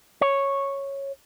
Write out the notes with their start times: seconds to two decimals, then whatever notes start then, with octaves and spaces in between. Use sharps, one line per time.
0.21 C#5